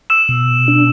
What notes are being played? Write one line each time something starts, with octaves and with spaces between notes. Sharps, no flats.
E6 E7
B2
D4